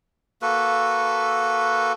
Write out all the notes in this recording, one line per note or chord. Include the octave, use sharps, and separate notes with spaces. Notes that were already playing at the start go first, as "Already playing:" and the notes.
A#3 F#4 A4 B4